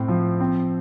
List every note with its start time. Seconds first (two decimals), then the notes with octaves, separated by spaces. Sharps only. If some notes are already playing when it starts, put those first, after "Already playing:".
Already playing: A2 C4
0.08 F3
0.40 C4